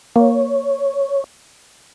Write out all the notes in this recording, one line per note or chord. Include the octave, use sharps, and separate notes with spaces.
A#3 C#5